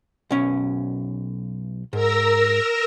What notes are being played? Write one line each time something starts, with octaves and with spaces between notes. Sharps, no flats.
B1 C#4
G#2 A#4 E6 A#6